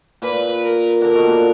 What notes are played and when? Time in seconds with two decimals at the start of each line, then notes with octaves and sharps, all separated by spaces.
0.22 A#2 B4
0.62 A#4
1.02 D3 A#4
1.15 B2
1.28 A#2